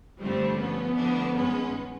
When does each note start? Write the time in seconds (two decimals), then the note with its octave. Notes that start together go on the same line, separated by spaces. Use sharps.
0.20 G2 D3 F3 G3 A3 C4
0.57 F3 A3 B3 C#4
0.96 D3 F3 A3 D4
1.33 G2 D#3 G#3 C#4